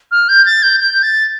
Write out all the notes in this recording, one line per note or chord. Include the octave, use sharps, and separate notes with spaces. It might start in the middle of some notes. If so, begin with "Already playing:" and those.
F6
G6
A6
G6
G6
A6